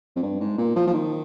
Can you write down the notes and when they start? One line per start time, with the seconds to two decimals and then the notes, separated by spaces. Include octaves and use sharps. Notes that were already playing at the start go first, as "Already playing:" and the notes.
0.16 F2
0.22 G2
0.40 G#2
0.58 A#2
0.76 F3
0.87 F3
0.93 D#3